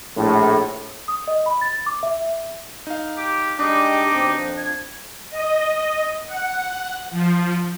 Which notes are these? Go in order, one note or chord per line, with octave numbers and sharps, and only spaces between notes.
A#1 A2
D#6
D#5
B5
A6
D6
E5
D#4 F5
G4
G3 G#3 D4 D#4 G4 D6
D#2 B2 C4
F2 F3
G#6
D#5
F#5
F3